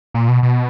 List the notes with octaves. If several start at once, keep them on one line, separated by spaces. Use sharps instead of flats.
A#2
B2
B2